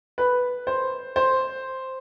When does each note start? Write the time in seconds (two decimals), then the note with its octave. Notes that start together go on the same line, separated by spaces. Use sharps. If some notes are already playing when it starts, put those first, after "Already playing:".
0.18 B4
0.67 C5
1.16 C5